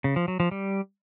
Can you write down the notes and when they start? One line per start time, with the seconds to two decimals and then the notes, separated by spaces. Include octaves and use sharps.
0.04 C#3
0.16 F3
0.28 F#3
0.40 F3
0.51 G3